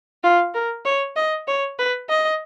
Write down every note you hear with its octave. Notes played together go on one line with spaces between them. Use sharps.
F4
A#4
C#5
D#5
C#5
B4
D#5